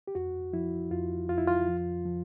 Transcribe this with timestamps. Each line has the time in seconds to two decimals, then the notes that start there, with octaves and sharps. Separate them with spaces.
0.08 G4
0.15 F2 F#4
0.53 F3 E4
0.91 F2 F4
1.29 F2 F4
1.38 E4
1.47 F4
1.68 F3
2.06 F3